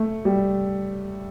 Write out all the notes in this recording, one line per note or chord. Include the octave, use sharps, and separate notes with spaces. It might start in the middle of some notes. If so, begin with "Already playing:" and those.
Already playing: A3
G3